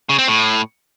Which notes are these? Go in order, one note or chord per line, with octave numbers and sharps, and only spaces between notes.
C#3
C4
A2